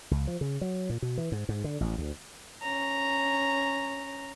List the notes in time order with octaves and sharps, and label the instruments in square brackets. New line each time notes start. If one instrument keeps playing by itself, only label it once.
[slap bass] C#2
F3
C#3
F#3
A#2
B2
E3
G#2
G#2
D3
A1
D2
[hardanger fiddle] C#4 A#5